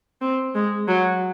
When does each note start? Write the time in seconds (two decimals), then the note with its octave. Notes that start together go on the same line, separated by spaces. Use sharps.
0.21 C4
0.55 G#3
0.88 F#3